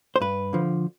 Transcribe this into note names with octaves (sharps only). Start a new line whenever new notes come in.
C5
G2 B4
D3 F3